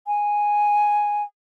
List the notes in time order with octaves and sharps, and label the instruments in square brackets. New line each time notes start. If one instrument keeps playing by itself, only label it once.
[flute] G#5